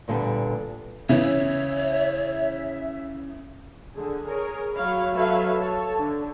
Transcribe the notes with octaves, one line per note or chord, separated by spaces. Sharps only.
E2 A#2 D3 G3 B3
C#3 E3 C#5 E5
D3 G#4
G#4 A#4 C#5
F#3 C#5 F5 B5
F#3 A4 B4 C#5 E5 F5
A4 C#5 A5
D3